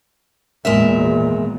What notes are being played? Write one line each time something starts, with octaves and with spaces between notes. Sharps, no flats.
G#1 E2 A#2 G#3 A#4 E5